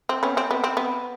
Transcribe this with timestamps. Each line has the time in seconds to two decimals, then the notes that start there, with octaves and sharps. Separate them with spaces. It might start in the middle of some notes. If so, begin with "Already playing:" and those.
0.09 C4
0.23 B3 C#4
0.37 C4
0.51 B3
0.64 C4
0.77 B3